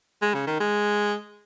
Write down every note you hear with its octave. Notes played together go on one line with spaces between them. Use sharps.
G#3
C#3
D#3
G#3